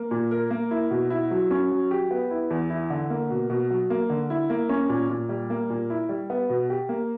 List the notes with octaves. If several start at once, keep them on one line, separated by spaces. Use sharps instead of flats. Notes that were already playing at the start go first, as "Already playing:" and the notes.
Already playing: A#3
A#2
A#4
A#3
E4
B2
E4
F#3
C#4
F#3
G4
B3
E4
E2
E4
D3
A#3
B2
B2
F#3
A#3
D3
E4
A#3
C#4
A#2
A#2
G3
A#3
A#2
E4
G3
B3
B2
G4
A#3